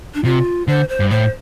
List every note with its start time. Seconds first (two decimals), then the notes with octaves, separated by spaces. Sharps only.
0.15 D4
0.24 C3 F4
0.68 D3 C5
0.89 C5
1.00 G2
1.10 A2 C5